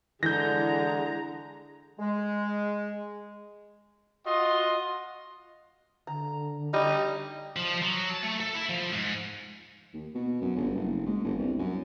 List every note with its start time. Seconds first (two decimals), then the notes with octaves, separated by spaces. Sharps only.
0.23 D3 E3 G#3 A#5 G6 A#6
1.99 G#3
4.26 F4 F#4 D#5 C6
6.07 D3 A#5
6.73 G3 D#4
7.56 F3
7.82 F#3
8.10 A5
8.23 A3
8.40 A4
8.55 E4
8.69 F3
8.93 G#2
9.94 D#2
10.14 B2
10.41 F#2
10.56 G1
10.75 F#1
11.06 G#2
11.24 G1
11.39 C2
11.59 F#2